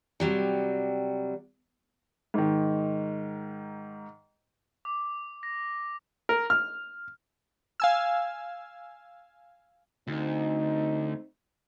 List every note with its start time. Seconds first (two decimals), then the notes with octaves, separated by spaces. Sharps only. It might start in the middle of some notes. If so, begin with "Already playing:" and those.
0.20 C3 F#3 G3
2.34 G#2 D#3
4.85 D6
5.43 A#6
6.29 A#4
6.50 F6
7.80 F5 G#5 E6
10.07 D2 C4 D#4